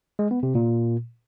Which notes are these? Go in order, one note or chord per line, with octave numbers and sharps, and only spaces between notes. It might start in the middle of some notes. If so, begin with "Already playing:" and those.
G#3
B3
C3
A#2